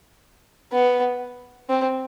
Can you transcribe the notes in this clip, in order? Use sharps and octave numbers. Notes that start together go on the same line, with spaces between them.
B3
C4